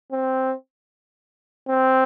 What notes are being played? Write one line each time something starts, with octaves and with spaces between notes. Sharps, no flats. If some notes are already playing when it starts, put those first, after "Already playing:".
C4
C4